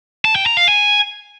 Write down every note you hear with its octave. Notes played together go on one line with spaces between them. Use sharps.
A5
G5
A#5
F5
G#5